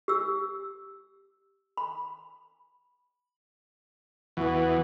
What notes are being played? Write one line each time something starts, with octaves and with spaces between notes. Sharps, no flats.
G4 E6
B5
E2 E3 B3 F#4